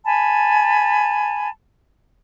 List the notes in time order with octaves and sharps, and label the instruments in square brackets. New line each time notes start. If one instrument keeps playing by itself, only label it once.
[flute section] G#5 A5 B5